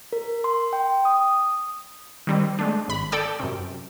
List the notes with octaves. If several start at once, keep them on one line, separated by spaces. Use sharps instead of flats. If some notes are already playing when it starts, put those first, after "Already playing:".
A#4
C6
G5
D#6
D#3 G3 C4
G#3 A3 D4
G#1 B5
A4 D5 G5 D6 E6
F#2 C3